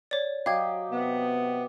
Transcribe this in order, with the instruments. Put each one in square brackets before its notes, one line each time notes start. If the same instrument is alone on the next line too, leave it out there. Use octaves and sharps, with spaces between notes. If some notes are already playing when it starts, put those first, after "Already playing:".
[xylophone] C#5 D5
[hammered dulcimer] F#3 G4 D#5 [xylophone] F5 G#6
[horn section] C3 B3